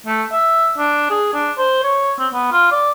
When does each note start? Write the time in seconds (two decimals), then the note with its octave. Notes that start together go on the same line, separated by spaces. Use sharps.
0.06 A3
0.32 E5
0.78 D4
1.10 G#4
1.34 D4
1.58 C5
1.84 C#5
2.19 C4
2.33 B3
2.52 F4
2.72 D5